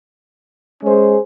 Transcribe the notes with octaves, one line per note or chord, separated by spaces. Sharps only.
G#3 C#4 G#4 C5